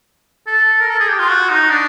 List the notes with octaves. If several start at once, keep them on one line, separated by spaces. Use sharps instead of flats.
A4
A#4
A4
G#4
G4
F4
F#4
D#4
D4